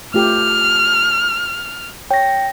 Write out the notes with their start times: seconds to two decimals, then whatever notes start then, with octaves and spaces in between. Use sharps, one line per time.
0.14 A3 F4 G4 F6
2.11 C#5 G5 A#6